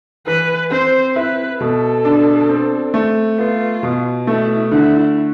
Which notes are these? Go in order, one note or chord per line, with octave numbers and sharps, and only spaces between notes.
E3 B4
C4 C5
E4 B4
B2 A4
D4
C4
A3
B3 F4
B2
A3 E4
D3 E4